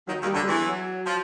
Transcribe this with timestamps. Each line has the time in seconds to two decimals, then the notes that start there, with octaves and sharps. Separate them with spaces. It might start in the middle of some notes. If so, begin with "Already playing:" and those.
0.08 D#2 D#3 F#3
0.21 D#2 D#3
0.26 G3
0.34 D2 D3
0.44 G3
0.48 E2 E3
0.62 F#3
1.06 F3